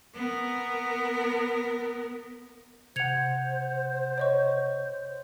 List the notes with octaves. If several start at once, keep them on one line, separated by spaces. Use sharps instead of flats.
B3 A#4
C3 C5 F#5 G#6 C#7 F7
C#5 D#5 C#6